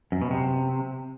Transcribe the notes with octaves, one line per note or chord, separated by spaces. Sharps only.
F#2
B2
C3